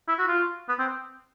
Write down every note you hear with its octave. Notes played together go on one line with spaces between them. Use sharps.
E4
F#4
F4
B3
C4